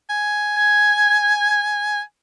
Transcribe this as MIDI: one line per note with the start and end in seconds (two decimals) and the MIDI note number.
0.10 2.01 80
0.55 1.61 92